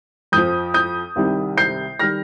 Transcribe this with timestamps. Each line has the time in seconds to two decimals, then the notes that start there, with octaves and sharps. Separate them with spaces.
0.32 F2 F3 D#6 G6
0.74 D#6 G6
1.16 C2 C3 D#3 G3
1.58 G6 C7
1.99 D#3 G3 F6 A#6